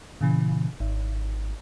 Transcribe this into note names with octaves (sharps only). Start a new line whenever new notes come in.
A#2 C#3 E3
G#1